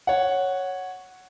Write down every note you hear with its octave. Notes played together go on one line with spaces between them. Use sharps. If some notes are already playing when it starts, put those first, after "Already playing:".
C#5 F#5